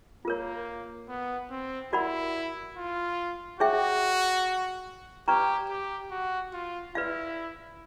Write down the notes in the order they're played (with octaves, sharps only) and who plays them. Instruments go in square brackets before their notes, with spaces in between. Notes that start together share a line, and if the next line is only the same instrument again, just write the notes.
[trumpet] A#3 [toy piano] F4 A#4 C#5
[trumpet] B3
C4
[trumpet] E4 [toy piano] F#4 A#4 D5 F#5 B5
[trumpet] F4
[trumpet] F#4 [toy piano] G#4 C#5 E5 G5
[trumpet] G4 [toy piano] B4 D5 G5 A#5 C#6
[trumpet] G4
F#4
F4
[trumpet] E4 [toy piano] B4 D5 F5